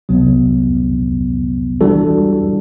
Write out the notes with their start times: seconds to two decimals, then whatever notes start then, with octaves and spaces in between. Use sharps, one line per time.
0.09 C2 C3 F#3 B3
1.81 E3 G3 D4 F#4 A4